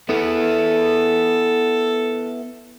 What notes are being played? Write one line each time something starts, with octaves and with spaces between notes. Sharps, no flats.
B3 E4 A4